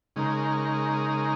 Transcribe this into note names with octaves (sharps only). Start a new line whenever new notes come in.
C#3 G#3 D#4 A#4